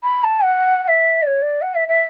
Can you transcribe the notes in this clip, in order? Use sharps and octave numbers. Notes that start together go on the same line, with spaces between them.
B5
A5
F#5
F#5
E5
D5
C#5
D5
F#5
E5
E5